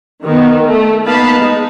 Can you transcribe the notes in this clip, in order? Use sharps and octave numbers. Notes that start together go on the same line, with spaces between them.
D#3 B3
A3
A#3 B3 D#4 F5 A5 B5
G#3 D#4